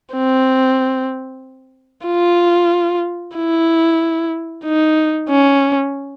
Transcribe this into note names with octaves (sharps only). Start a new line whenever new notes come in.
C4
F4
E4
D#4
C#4